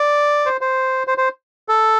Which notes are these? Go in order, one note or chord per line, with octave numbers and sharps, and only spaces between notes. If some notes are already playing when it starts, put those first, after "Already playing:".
Already playing: D5
C5
C5
C5
C5
A4